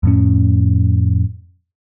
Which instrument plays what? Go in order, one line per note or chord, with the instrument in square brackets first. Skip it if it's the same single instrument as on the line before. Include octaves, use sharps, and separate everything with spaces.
[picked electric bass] F2 A2 C#4